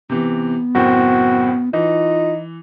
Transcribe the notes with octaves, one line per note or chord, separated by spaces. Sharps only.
C3 E3 B3
F#1 A2 C4 F#4
E3 D#4 F4